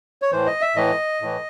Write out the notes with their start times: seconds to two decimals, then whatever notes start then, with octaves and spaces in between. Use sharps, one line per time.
0.22 C#5
0.32 A2 E3 C5
0.46 D#5
0.61 E5
0.76 A2 E3 D#5
1.22 A2 E3